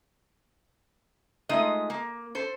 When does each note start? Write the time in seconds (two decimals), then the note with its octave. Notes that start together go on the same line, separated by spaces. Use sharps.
1.49 G#3 A3 D#4 F4 D#5
1.90 A#3
2.35 A4 C5